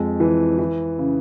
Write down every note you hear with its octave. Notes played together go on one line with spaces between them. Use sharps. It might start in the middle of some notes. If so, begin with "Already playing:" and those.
Already playing: F2 G#3
E3
E3
C#3